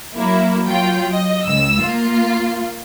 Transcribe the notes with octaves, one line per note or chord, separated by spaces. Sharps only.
F#3 A#3 E4
F#3 F4 G5
D#5
C#2 E6
A#3 F4